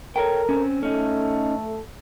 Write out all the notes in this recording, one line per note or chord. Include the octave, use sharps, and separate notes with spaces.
A4 A#4 C#5 G5
C4 C#4
A3 C#4 D#4 A4